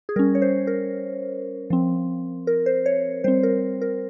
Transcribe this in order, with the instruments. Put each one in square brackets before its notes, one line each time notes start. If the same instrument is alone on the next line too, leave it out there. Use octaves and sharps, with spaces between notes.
[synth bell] G#4
G3 C#4 A#4
C#5
C5
A#4
F3 C4
A#4
C5
C#5
G3 C4 C5
A#4
A#4